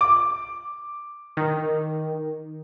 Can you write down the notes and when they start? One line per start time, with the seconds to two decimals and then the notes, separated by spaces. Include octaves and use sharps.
0.01 D6
1.37 D#3